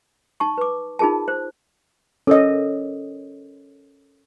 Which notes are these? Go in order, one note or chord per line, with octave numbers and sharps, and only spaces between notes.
D#4 A5 C#6
B4 D6
D#4 F4 G#4 A#4 A5
C5
C#4 A4 A#4 C#5 D#5